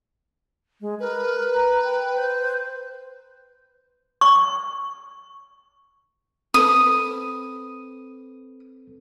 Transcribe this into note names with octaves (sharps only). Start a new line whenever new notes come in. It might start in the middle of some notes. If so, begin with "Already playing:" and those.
G#3
A#4 B4
A#5
G5
C5
C#6
C4 A4 B4 D#6